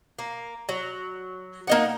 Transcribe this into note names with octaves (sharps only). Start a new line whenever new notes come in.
A#3
F#3
A#3 D#4 F#5